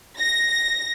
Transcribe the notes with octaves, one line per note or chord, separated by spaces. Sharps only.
A#6